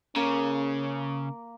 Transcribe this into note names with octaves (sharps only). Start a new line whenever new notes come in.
C#3 A#3 C#4